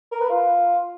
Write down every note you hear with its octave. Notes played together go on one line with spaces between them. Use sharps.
A#4
B4
F4